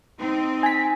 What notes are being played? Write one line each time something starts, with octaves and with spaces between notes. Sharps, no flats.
C4 D#4
G#5 B6